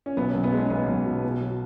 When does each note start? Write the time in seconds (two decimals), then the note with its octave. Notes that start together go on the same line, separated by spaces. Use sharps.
0.06 C#4
0.17 B1 B3
0.30 C#4
0.35 B1
0.43 B3
0.53 G#3 C#4
0.70 B1 B3
0.88 B1
1.06 B2
1.24 B2
1.41 F#3